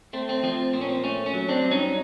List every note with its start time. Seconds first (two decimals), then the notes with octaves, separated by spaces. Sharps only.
0.13 A3 C4
0.29 C4
0.43 F3 C4
0.73 A#2 C4
0.81 C#4
0.89 C4
1.04 A3 C#4
1.26 C#4
1.34 F#3
1.48 C4 D4
1.64 G2
1.71 C#4 D#4